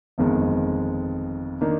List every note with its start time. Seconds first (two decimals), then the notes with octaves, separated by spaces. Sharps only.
0.18 G1 F2 D#3 G#3
1.61 D#3 A#3 D4